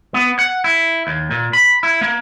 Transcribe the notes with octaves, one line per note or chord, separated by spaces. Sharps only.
B3
F#5
E4
D#2
A#2
B5
E4
A#3